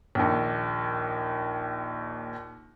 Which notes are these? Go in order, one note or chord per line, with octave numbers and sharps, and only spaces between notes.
A#1 D#2